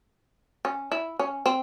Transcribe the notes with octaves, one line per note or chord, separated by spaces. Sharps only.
C#4
E4
C#4
C4